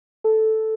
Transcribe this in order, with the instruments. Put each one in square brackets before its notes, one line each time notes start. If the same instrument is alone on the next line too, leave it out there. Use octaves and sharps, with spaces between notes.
[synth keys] A4